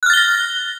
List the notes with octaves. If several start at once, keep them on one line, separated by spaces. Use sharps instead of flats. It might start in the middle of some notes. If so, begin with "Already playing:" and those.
F6 F#6 A6 A#6 G7